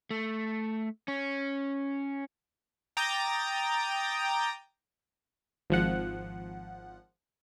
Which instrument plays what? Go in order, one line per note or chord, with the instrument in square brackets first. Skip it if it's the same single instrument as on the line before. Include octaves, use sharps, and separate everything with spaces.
[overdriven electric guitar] A3
C#4
[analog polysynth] G5 A#5 D6 D#6 G6 A6
[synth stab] G#1 F3 F#5